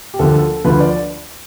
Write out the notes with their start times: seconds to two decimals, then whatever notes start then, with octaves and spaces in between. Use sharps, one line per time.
0.14 G4
0.19 D2 D3 F3 A4
0.42 A4
0.64 D2 D3 F3 B4
0.80 D5